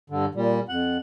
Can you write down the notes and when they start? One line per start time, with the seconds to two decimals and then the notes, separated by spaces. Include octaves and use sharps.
0.10 G2 D3
0.35 A#2 G3
0.69 F2 F#5